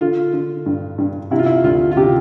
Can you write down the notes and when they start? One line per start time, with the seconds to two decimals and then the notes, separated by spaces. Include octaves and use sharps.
0.01 D3 F4
0.33 D3
0.66 G2
0.98 G2
1.31 C3 E4
1.39 F4
1.46 E4
1.64 D2 F4
1.91 F4
1.97 C3 G4